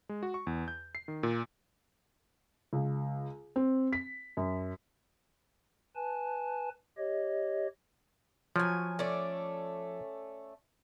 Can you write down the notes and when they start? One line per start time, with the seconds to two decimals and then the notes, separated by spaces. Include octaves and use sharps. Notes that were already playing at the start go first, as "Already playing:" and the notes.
0.09 G#3
0.23 F#4
0.34 C#6
0.47 E2
0.68 G6
0.95 C7
1.08 D#3
1.23 A#2
2.73 C#2
3.56 C4
3.93 B6
4.37 F#2
5.96 B4 G#5 A5
6.98 G4 C#5 D#5
8.56 F3 F#3 G#5
8.99 A3 C#4 D5